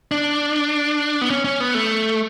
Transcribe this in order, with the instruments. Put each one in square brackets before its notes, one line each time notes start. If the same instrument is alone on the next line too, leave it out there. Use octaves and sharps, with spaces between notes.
[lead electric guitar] D4
B3
C#4
C#4
B3
A3